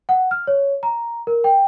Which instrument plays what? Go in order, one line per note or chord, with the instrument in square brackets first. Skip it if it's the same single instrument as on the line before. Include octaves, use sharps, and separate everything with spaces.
[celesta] F#5
F6
C#5
A#5
A#4
G5